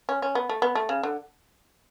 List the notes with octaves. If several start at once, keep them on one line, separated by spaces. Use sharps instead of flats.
C#4
C#4
B3
A3
B3
A3
C#3
D3